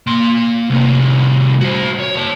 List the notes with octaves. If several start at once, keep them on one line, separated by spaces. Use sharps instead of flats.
A#3 C6
C2 A2
F#4 C5
C#5
C#5 A5